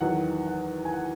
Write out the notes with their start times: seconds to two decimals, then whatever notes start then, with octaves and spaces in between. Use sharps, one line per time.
0.01 E2 D#3 F#3 F#5
0.47 F#5
0.85 G#5
0.93 F#5